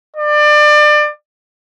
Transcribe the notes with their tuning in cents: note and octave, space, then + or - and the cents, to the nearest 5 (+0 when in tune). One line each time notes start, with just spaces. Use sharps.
D5 +30